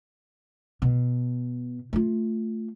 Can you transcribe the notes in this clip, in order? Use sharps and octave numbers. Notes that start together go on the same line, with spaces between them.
B2
A3 F4